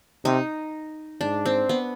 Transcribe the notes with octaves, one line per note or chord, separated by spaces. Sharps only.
C3 D#4
G#2 D4
C4
B3